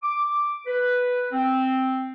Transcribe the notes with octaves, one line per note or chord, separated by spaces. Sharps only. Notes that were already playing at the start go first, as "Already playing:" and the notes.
D6
B4
C4